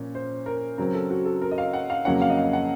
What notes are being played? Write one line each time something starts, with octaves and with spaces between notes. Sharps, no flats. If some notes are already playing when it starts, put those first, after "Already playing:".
Already playing: A#2 F3 A#3 C#4
C5
A#4
C#3 F#3 C4 A#4
A4
F#4
A4
A#4
D#5
F5
F#5
F5
F2 C#3 F#3 A#3 C#4 F#5
F5
D#5
F5
F#5